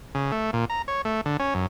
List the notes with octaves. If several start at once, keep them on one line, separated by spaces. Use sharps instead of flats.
C#3
A3
A#2
A#5
C#5
A3
D3
C#4
F#2